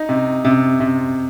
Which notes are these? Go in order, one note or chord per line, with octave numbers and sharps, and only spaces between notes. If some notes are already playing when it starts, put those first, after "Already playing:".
Already playing: D#4
C3
C3
C3